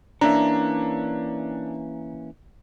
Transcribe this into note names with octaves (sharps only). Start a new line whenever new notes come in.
E3 A#3 C#4 D4 E5 A#5